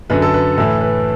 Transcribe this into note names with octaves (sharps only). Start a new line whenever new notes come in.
F#2 D3 F#3 B4
A4
B4
A2 E3 A4
B4